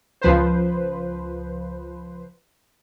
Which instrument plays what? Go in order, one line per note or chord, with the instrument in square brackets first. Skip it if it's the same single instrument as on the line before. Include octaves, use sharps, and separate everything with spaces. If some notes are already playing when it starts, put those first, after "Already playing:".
[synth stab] C#2 F3 B4 C5